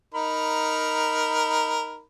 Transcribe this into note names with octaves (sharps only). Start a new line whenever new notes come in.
D#4 A#4 B5